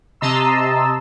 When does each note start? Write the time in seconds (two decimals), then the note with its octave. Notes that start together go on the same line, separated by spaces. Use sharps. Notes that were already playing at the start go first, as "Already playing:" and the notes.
0.21 C3 D#5 A5 A#5 C6 E6